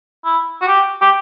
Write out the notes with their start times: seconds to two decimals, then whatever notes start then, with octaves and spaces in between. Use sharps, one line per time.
0.25 E4
0.62 F#4
0.68 G4
1.01 G4